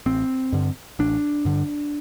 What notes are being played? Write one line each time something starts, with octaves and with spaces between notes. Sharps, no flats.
A1 C4
G2 D3
A1 D4
G2 D3